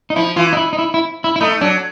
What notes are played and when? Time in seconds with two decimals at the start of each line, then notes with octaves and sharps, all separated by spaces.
0.10 D#4
0.16 F3 E4
0.36 E3 F4
0.53 D#4
0.57 E4
0.73 D#4
0.79 E4
0.94 E4
1.24 E4
1.36 E4
1.41 A3 D#4
1.61 F#3 D4